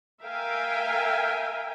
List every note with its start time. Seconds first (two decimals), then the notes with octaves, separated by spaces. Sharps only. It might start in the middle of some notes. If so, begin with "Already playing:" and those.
0.22 A#4 E5 F5 G5 G#5